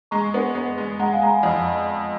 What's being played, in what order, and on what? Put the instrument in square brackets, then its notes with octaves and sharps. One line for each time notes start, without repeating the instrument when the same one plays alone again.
[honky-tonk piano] G#3 [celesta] A#5 C#6
[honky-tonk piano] B3
B3
G#3
[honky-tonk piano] G#3 [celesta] F#5 A#5
[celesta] F5 G#5
[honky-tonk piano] G#3 [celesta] A#5
[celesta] G#5 B5
[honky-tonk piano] F2